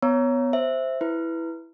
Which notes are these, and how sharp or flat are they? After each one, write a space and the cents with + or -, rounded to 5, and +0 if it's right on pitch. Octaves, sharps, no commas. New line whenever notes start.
B3 +15 C#5 +0 A#5 +0
C5 +0 E5 +0
E4 +0 B4 +0